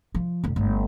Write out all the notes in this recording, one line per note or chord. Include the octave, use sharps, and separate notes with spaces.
F3
F1 F2
G1 A3